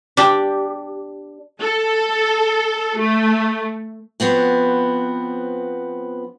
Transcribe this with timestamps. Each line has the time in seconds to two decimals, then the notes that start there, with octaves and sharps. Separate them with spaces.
0.17 D4 G4
1.60 A4
2.98 A3
4.20 F3 B3 C4 F#4